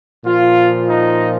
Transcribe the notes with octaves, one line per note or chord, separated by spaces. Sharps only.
A#2 F3 F4
D#4